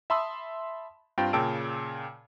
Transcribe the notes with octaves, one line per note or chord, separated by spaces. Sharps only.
E5 A5 B5 C6 D#6 E6
G2 C4 F4 G5
A#2 C#3 G5 A5 E6 D7